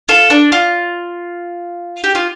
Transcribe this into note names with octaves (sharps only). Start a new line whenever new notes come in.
F4 A4
D4
F4
G4
F4